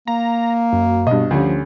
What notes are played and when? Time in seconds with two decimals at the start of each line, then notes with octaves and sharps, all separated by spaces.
0.08 A#3 A#5
0.73 F#2
1.07 G2 B2 D#5
1.31 D2 F3 G3 C#4